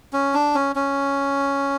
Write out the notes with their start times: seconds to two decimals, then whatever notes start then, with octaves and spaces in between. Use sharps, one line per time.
0.13 C#4
0.34 D4
0.55 C#4
0.76 C#4